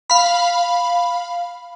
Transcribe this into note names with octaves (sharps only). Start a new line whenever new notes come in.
F5 B5